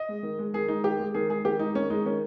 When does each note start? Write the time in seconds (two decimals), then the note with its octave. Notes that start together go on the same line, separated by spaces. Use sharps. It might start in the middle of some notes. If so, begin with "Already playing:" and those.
Already playing: D#5
0.09 G#3
0.23 D#3
0.39 G#3
0.54 D#3 G#4
0.68 G#3 D#4
0.84 D#3 G4
0.99 G#3
1.14 D#3 G#4
1.29 G#3 G#4
1.45 D#3 G4
1.59 G#3 D#4
1.75 D#3 C#4
1.90 G#3 D#4
2.05 D#3 C#4